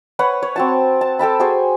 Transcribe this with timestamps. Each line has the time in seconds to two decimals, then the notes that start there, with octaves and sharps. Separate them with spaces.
0.19 B4 C#5 F#5
0.42 C#5
0.56 C4 F#4 A5
1.01 A5
1.19 A4 G5 A5 B5
1.40 F#4 G#4 C5 G#5